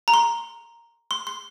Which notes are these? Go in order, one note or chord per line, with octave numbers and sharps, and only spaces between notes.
A#5
C6
C6
C6